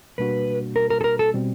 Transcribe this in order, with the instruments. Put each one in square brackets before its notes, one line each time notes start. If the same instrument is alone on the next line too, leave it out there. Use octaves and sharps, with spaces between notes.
[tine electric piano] B2 G3 A#3 D4 F#4 [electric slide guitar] B4
[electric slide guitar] A#4
A#4
A4
A#4
A4
[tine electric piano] B2 G3 C4